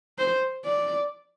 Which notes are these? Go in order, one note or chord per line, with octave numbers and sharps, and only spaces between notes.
C5
D5